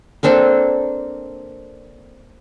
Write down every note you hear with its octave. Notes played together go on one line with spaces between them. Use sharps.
A#3 C4 D4 A4